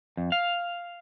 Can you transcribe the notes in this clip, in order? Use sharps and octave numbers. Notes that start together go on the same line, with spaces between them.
F2
F5